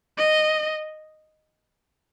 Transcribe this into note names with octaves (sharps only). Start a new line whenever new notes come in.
D#5